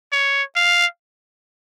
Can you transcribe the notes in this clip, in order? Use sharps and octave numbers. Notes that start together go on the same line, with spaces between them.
C#5
F5